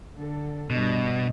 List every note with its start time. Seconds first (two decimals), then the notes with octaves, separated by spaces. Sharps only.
0.18 D3 A4
0.70 G2 B2 D4 D#5